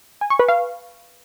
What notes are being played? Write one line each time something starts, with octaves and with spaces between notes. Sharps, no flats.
G#5
C#6
B4
F5